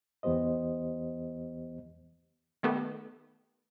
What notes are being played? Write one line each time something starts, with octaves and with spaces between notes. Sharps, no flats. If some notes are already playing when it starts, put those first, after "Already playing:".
E2 E3 B3 G4 C5 D#5
D#3 A3 B3 G4 A4